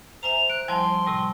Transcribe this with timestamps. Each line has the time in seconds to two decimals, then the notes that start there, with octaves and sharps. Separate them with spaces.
0.23 C5 E5 G#5 A#5 F7
0.50 F#6 D7
0.68 F3 G3 E4 G#5 A5 C6
1.07 A2 C3 G3